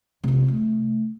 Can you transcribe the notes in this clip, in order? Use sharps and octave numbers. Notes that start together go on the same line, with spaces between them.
C3 F4
A3